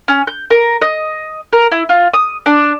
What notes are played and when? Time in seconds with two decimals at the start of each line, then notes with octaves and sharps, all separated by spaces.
0.08 C#4
0.27 G6
0.50 A#4
0.82 D#5
1.53 A#4
1.72 E4
1.89 F4
2.13 D#6
2.46 D4